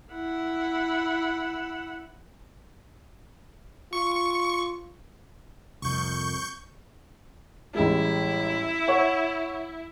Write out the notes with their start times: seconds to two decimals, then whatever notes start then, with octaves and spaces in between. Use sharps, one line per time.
0.13 E4 F#5
3.93 F4 C#6
5.82 C2 F2 C#6 G6
7.75 A1 G3 G#3 E4
8.88 C#5 F#5 C#6